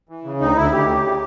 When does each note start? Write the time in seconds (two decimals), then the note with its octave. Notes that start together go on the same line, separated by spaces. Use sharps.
0.09 E3
0.24 C#3
0.40 D2 D#4
0.56 D2 E4
0.72 D2 G4
0.88 C#3
1.04 C#3